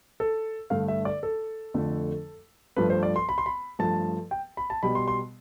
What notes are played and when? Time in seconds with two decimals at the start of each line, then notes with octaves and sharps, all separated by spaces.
0.20 A4
0.70 G2 D3 A3 F5
0.88 E5
1.05 D5
1.23 A4
1.74 F2 D3 F3 A3
2.76 G2 F3 A3 B4
2.90 C5
3.03 D5
3.16 C6
3.29 B5
3.38 C6
3.46 B5
3.79 G2 F3 A3 A5
4.31 G5
4.57 B5
4.70 A5
4.83 B2 G3 B5
4.95 C6
5.08 C6